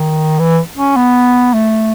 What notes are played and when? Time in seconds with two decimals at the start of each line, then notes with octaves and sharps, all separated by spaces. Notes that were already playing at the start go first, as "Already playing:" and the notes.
Already playing: D#3
0.39 E3
0.77 C#4
0.96 B3
1.54 A3